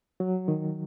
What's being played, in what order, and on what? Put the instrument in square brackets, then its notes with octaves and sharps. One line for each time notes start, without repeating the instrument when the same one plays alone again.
[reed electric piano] F#3
D#3